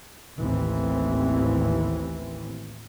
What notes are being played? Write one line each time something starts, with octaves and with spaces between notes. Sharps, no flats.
A1 D#2 E3 C4